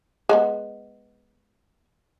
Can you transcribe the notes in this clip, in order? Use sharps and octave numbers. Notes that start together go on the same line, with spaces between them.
G#3 A#3 B3